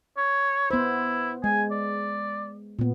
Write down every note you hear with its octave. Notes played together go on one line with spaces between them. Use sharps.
C#5
B3 E4 C5
G#3 G#5
D5
A#2 B3